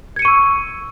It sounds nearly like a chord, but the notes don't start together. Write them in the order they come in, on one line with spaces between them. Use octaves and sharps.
G#6 C#7 D#7 C#6 E6